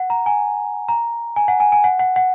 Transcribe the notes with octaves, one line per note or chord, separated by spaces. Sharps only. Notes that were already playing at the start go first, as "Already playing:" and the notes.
Already playing: F#5
A#5
G#5
A#5
G#5
F#5
G#5
G#5
F#5
F#5
F#5